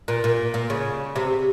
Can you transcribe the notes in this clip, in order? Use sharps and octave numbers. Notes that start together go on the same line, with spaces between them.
A#2
A#2
A#2
C#3
C3